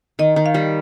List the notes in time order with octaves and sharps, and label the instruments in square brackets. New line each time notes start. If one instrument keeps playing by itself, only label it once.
[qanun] D#3 [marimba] D#5
[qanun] D#3
[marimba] F5
[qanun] G3